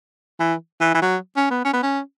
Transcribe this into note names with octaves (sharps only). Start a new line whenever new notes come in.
E3
E3
E3
F#3
C#4
B3
C#4
B3
C#4